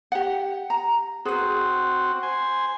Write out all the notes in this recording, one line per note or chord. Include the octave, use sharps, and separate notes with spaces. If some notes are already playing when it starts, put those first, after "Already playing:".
G4 F#5
A#5
C4 F#4 G#4 B4
C5 G#5